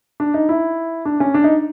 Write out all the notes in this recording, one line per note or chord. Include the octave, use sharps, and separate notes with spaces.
D4
D#4
E4
D4
C#4
D4
D#4